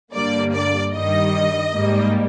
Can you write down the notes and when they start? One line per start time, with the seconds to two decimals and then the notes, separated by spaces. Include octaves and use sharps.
0.14 G2 D3 G3 A#3 D5
0.54 D5
0.94 G2 D#3 G3 D#5
1.74 G#2 G3 A#3